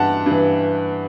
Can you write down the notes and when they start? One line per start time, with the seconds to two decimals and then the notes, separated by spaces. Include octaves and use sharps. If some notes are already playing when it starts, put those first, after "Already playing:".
Already playing: G2 E3 F#5 A5
0.26 G2 E3